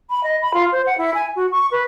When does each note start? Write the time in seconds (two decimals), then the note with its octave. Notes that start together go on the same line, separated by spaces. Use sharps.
0.10 B5
0.23 D#5
0.42 B5
0.54 F4
0.72 C5
0.86 F#5
0.98 E4
1.14 G#5
1.35 F#4
1.51 C#6
1.71 B4